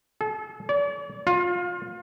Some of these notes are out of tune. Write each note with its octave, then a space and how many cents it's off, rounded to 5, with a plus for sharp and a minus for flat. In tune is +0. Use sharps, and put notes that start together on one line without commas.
A4 -35
D5 -40
F4 +25